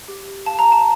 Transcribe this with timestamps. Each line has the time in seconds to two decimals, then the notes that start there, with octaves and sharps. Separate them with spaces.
0.08 G4
0.46 F5 A5
0.59 A#5
0.72 A5